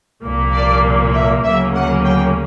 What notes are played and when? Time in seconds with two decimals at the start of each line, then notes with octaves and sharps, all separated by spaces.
0.23 C2 A#2 F3 A#3
0.53 D5
1.13 E5
1.44 D2 C#3 F#3 A#3 C#4 E5
1.75 F#5
2.04 G5